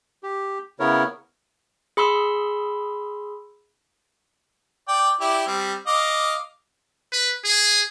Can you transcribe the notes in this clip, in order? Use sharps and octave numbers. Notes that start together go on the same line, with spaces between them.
G4
C#3 B3 E4 A#4 C#5
G#4 B5 C6 E6
D5 G5
E4 G4 D5
G3 C4
D#5 F5 D6
B4
G#4